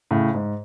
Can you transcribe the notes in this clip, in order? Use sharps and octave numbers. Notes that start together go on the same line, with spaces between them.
A2 C#3
G#2